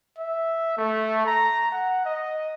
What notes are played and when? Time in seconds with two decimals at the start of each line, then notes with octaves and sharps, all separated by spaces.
0.19 E5
0.77 A3
1.26 A#5
1.72 F#5
2.05 D#5